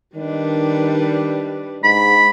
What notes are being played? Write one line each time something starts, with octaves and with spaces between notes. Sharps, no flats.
D#3 G3 D4 B4
G#2 B5